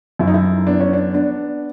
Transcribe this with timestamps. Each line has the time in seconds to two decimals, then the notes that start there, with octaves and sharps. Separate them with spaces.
0.19 F#2 E4
0.27 D#4
0.34 E4
0.67 B3 D4
0.80 C#4
0.93 D4
1.14 B3 D4